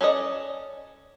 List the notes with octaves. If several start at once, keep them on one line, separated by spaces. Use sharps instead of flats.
C#4 A4 D5 D#5